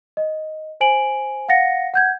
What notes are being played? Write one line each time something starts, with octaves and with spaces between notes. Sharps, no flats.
D#5
C5 G#5 D7 F#7
F5 F#5 A6 A#6 C#7
F#5 G6 G#6